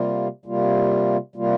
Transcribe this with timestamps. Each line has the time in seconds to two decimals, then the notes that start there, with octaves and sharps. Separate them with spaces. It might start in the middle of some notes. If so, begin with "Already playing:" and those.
Already playing: C3 G3 A#3 F4
0.46 C3 G3 A#3 F4
1.36 C3 G3 A#3 F4